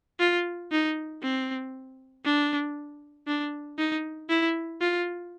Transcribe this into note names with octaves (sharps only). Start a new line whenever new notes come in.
F4
D#4
C4
D4
D4
D#4
E4
F4